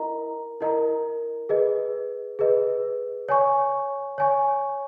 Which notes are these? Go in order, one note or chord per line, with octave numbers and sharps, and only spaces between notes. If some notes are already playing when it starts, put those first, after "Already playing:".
Already playing: E4 A#4 D#5 A#5
E4 A#4 D#5 A#5
G#4 B4 D#5
G#4 B4 D#5
C#5 G#5 C#6
C#5 G#5 C#6